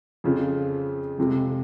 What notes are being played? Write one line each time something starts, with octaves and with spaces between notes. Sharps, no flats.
F2 C#3 F3
F2 C3 F3 G#3